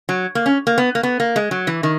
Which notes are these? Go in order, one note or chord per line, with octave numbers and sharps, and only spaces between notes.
F#3
A#3
C#4
A#3
B3
A#3
B3
A#3
G#3
F#3
E3
D#3